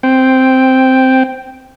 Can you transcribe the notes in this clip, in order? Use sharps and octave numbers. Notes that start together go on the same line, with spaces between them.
C4 G5